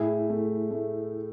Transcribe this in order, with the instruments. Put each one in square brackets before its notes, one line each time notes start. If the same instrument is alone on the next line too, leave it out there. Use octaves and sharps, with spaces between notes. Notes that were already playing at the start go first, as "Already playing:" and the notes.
Already playing: [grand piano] A2 [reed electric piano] E4 G#4
[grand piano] A3
A3